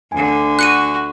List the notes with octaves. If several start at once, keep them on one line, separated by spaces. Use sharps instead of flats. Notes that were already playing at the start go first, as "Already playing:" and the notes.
D2 D3 G#5
F#4 F#6 C#7 D#7